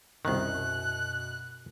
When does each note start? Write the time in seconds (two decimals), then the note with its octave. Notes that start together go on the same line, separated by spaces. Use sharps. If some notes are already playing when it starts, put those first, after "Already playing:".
0.25 C2 F#2 B2 D#3 F#6